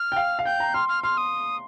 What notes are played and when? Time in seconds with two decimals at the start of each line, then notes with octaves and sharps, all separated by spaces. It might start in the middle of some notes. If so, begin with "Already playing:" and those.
Already playing: F6
0.12 G5
0.16 F5
0.39 F5
0.45 G5 G6
0.60 A#5
0.74 C6 F6
0.89 F6
1.03 C6 F6
1.17 D#6